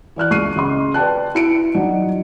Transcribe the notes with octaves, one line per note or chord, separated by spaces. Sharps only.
E3 D5 F6 F#6
C#2 C#6 C7 D#7
C#3 D#5 C6
B4 D5 G5 A5 F#6
E4 C#7 D7
F#3 D4 D#4